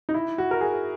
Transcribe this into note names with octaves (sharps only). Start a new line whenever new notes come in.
D#4
E4
F#4
A#4
G#4